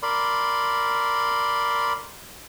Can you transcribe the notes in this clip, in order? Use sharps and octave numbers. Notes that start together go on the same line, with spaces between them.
A#4 D5 B5 C6